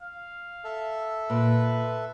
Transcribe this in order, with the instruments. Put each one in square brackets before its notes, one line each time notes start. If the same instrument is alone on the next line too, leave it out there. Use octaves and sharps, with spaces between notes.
[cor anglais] F5
[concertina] A4 E5
[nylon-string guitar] A#2 [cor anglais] B4